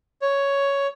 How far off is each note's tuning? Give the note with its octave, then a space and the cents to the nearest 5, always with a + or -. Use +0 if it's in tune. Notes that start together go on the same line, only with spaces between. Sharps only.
C#5 +5